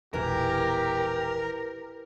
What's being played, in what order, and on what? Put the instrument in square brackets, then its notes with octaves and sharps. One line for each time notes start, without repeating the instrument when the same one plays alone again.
[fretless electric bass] E1 A#1 E2 [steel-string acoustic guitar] E3 [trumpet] G4 [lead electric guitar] A#4